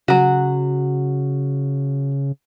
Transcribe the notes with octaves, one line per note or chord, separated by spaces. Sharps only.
C#3 F#3 F#4